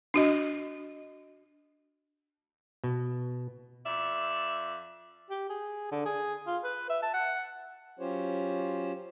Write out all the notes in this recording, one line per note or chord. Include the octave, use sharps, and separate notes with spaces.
D4 F#4 D#5
B2
F2 D5 E5
G4
G#4
D3
G#4
F4
B4
E5
A5
F#5
F#3 C#4 F4 G4 C5 C#5